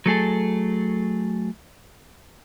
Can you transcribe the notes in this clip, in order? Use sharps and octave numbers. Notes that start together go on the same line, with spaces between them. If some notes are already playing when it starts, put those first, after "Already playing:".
F#3 A3 G#4 A4